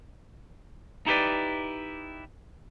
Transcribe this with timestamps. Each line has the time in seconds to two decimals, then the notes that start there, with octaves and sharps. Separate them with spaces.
1.06 D#4 E4 G4 G#4 B4 D5